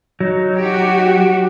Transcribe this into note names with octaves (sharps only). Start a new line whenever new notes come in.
F#3 D#4
F#4 G4